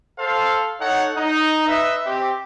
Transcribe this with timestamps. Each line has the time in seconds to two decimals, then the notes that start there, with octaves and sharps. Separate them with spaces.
0.19 A4 C5 F5
0.80 D#4 A4 C#5 F#5
1.17 D#4
1.67 B4 D#5 E5
2.06 C4 G4